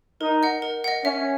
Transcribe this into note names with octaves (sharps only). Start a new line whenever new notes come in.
D#4 A#4
D#5 F#5
A#4
D#5 F#5
C#4 E5